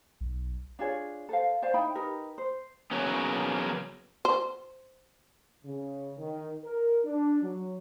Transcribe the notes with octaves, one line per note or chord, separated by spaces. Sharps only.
B1
D4 F4 G#4 C#5
A4 C5 F5
C5 D5 F5 G#5
D#4 E4 G5 B5
D#4 G4 A#4 B4
C5
C#3 F#3 A#3 B3 C#4
C5
C#3
D#3
A#4
D4
F#3